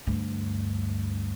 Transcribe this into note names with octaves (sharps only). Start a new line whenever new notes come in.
D2 G2